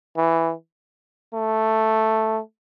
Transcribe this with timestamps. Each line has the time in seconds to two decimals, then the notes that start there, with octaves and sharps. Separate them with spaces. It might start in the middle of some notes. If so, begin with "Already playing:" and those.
0.17 E3
1.34 A3